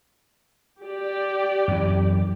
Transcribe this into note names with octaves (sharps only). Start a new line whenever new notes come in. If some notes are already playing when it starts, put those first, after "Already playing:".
G4 D5
F#2 E3